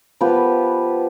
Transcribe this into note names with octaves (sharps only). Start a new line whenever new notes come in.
F3 B3 G4 B4